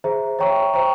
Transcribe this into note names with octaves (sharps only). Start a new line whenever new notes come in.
G#4 C5 E5 A#5
C#5 E5 G5 A#5 C#6
C5 G5 A#5 C#6